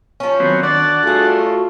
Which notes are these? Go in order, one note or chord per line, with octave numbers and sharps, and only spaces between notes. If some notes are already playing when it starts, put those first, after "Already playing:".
F3 C#4
D#3 F#3 B3 C4
D4 F#4 D5 F#5 A5
G3 A3 F4 F#4 G#4